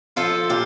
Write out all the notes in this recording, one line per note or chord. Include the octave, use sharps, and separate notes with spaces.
F3 F4 A4
A#2 G4